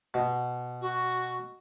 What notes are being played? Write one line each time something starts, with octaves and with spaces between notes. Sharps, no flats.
B2
F#4